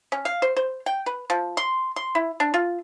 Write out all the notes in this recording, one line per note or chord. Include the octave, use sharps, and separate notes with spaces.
C#4
F5
C5
C5
G5
B4
F3
C6
C6
E4
D4
F4